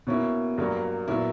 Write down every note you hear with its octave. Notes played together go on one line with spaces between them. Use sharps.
B2 A#3 C#4 E4
G2 F#3 A#3
A#2 F#3 B3 E4